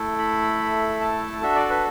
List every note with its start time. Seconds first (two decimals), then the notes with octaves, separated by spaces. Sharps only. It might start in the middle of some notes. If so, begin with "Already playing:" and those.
Already playing: A3 E4 A4
0.19 B5
1.01 A5
1.42 D4 F#4 A4 E5
1.56 D5
1.70 B4